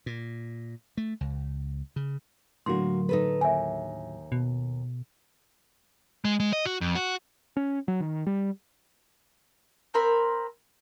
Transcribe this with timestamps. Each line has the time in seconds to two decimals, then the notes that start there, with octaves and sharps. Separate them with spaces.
0.06 A#2
0.97 A3
1.21 C#2
1.96 C#3
2.66 A2 D3 F#3 A#3 F#4 C6
3.09 D#4 A4 B4
3.41 D#2 E5 G#5
4.32 B2
6.25 G#3
6.40 G#3
6.53 D#5
6.66 F#4
6.81 F2
6.95 F#4
7.57 C#4
7.88 F#3
8.00 D#3
8.27 G3
9.94 C4 A#4 B5